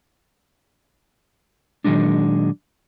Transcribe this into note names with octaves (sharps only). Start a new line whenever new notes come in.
A#2 D#3 F#3 G#3 D4